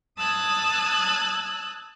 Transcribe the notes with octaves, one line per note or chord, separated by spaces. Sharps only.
A5 D#6 E6 F#6 G#6